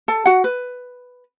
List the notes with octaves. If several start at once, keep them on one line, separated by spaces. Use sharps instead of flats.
A4 A5
F#4 F#5
B4